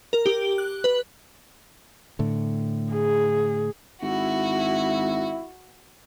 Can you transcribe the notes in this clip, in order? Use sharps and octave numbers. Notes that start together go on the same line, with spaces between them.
A#4
G4
F#6
B4
A2 D3
G#4
G#1 E4 F#4